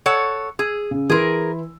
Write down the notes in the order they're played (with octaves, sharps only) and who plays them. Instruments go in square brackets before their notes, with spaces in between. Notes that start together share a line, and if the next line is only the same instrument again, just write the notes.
[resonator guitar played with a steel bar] A4 C#5 F#5
[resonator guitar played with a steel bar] G#4 [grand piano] E6
[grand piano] C#3
[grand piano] E3 E4 C6 [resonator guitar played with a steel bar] G#4 A#4